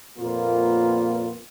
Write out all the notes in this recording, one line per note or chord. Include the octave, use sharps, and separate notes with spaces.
F2 A#2 A#3 B3 F4